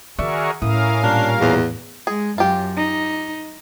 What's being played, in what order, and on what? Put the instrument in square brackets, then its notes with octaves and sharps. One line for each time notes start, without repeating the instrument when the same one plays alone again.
[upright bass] D#3 [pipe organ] F#4 G#4 A#4 [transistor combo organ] D5 E5 C#6
[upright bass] A2 [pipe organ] C#4 A#4 F5 [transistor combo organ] E4 D#6
[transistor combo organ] A#2 G3 F4 [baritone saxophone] D4
[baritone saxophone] E2
[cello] G#3 [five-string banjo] G#4
[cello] F#2 [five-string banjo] F4 G4
[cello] D#4